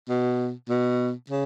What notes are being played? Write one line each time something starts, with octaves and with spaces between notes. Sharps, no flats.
B2
B2
C#3